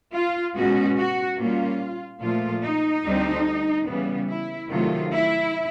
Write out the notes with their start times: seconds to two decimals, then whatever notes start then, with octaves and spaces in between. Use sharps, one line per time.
0.14 F4
0.56 B2 G#3 C#4 F#4
0.97 F#4
1.38 A#2 G3 A#3 C#4 F4
2.22 A#2 F3 A3 F4
2.63 D#4
3.04 D2 D3 G3 C4
3.88 C#3 E3 G3 B3
4.29 E4
4.70 C3 D#3 F#3 A3 F4
5.12 E4